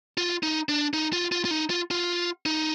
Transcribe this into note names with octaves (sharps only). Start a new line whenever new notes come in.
F4
D#4
D4
D#4
F4
F4
F4
D#4
F4
F4
D#4